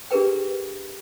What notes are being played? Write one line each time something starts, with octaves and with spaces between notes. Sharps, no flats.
D4 G4 G#4 A#4 B4 G5